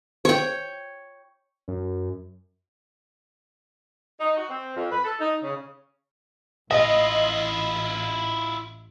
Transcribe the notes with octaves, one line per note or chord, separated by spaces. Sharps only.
C#5 G5
F#2
D#4
F#4
C4
F2
B4
A4
D#4
C#3
A1 E4 F4 D#5